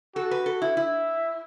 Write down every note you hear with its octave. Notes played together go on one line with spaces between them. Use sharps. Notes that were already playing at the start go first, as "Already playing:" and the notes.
F#4 A4
B4
A4
E4
E4 E5